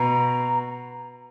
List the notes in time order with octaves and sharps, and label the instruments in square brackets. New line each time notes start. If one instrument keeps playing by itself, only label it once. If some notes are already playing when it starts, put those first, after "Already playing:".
Already playing: [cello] B2 [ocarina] A#5